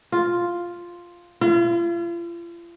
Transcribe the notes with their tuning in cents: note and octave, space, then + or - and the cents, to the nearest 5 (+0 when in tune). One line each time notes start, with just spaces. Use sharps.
F4 +0
F4 -40